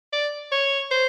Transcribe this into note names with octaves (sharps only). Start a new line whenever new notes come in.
D5
C#5
C5